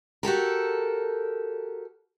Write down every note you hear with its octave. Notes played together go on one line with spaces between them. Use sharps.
F#4 G4 A4 A#4